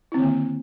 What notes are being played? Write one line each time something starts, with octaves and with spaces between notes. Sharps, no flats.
D3 D#3 A#3 C4 E4